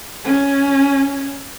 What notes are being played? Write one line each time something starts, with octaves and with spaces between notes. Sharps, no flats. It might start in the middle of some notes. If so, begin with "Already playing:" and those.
C#4